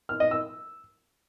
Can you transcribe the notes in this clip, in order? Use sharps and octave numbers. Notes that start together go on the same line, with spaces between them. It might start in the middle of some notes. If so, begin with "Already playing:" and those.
F6
D#5
E6